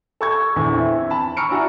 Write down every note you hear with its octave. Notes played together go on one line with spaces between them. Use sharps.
A4 C#6 G#6
A#1 E2 C#6
C4 E4
A5 B5
A#5 C#6 E6 F6 C#7 D7
D4 E4 F#4 G#5 A#5